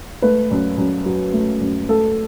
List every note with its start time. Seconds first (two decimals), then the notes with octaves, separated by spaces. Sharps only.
0.22 A3 B4
0.51 F#2
0.78 F#2
1.06 F#3
1.33 A3
1.61 F#2
1.88 A3 A4